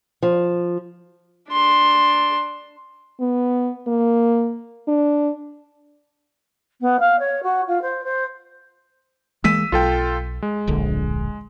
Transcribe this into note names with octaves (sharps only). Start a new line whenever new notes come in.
F3
D4 C6
B3
A#3
D4
B3
F5
C#5
F#4
F4
C5
C5
E3 G#3 A#3 E6 B6 D#7
B1 F4 A4 G5
G#3
D1 A#1 D3